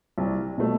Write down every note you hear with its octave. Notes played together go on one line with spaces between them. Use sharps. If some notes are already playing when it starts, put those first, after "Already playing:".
C2
B2 A3